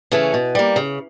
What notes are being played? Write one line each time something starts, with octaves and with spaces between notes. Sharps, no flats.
C#3 E3 A3 C#4
B2
G3 A#3
C#3